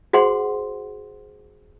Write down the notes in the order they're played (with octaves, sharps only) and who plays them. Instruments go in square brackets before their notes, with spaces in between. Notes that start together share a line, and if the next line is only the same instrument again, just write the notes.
[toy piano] F#4 G#4 C5 F#5 C6